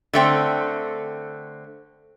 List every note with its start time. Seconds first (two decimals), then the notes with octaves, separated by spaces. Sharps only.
0.13 D3 A3 C4